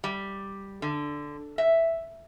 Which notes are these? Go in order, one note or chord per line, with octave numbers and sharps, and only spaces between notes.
G3
D3
E5